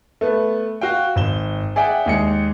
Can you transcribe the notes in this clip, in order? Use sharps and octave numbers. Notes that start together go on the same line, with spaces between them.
A3 B3
F#4 F5 G5
G#1 E7 G7
G#4 D5 E5 F#5 G5
D#2 G#3 C#7